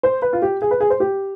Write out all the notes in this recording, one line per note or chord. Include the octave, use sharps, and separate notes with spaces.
C5
B4
F4
G4
G#4
B4
G#4
C5
G4